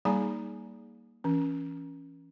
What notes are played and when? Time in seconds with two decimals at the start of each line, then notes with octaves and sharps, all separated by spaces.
0.05 G3 A#3 D#4 G#4 G#5 A#5
1.24 E3 C#4